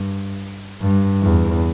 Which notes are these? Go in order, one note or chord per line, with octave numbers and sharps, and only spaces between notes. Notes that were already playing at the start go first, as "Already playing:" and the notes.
Already playing: G2
G2
E2